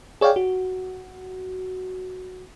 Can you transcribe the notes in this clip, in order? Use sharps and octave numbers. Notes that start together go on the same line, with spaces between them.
G#4 C#5 D5 F5 G5
F#4